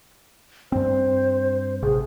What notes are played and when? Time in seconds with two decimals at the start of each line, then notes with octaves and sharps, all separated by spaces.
0.72 G2 C4 C5
1.82 A1 C3 G#4